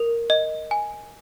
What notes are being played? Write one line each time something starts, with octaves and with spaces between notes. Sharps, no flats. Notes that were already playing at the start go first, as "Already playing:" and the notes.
Already playing: A#4
D#5
G#5